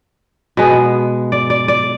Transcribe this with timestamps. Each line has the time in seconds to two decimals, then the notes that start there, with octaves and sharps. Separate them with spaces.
0.57 B2 G#3 B3
1.32 D5
1.50 D5
1.68 D5